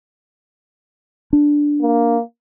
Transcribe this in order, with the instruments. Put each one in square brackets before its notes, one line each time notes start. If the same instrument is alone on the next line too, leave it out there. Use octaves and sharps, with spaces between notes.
[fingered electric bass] D4
[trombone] A#3